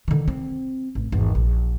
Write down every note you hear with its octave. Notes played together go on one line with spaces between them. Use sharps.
D3 D#3
C4
A1
G#1 E2
A#1